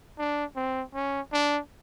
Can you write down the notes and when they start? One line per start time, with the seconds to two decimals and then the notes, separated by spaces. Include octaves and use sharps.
0.18 D4
0.56 C4
0.94 C#4
1.33 D4